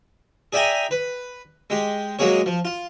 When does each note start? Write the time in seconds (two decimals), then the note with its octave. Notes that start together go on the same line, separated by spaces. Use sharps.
0.53 G#4 D5 E5 G5 G#5 A#5
0.91 B4
1.70 G#3 G4
2.19 F#3 G#3 A#3 G#4 C#5
2.46 F3
2.65 F4